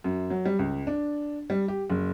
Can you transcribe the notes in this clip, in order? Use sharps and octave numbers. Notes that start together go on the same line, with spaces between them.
F#2
F#3
G3
C#2
D4
G3
G4
F#1